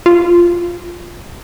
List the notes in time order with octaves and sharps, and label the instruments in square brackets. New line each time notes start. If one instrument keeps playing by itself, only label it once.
[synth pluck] F4